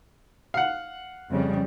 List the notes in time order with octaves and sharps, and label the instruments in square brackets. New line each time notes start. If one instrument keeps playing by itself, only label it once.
[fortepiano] F5 F#5
[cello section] F2 C#3 G3